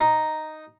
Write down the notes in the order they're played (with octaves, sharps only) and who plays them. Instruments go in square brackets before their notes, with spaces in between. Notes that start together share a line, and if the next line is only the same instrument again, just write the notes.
[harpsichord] D#4